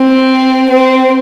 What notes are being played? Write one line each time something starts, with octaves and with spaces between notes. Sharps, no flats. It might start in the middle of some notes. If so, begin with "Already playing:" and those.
Already playing: C4
C4